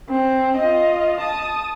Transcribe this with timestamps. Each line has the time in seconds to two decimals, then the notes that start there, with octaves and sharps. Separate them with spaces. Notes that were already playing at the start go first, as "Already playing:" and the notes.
0.10 C4
0.57 F4 D#5
1.20 A5 D#6